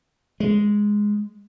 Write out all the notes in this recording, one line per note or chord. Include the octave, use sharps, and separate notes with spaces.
G#3